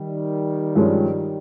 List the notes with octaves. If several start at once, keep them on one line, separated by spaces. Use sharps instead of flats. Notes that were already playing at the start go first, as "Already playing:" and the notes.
Already playing: D#3 G3
G2 F3 G#3 C#4